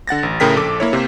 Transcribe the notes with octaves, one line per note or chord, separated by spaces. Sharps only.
D3 F#5 A6 A#6
A1
A2 C#3 A#4 G5 B6
A#1 A4 D6
A#3 E4 C#5
C3 A#3 C5